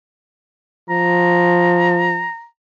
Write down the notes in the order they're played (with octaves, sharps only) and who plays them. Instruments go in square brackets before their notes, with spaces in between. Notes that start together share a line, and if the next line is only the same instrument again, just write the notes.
[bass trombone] F3 [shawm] A#5